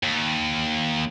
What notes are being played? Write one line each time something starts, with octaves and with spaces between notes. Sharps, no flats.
D#2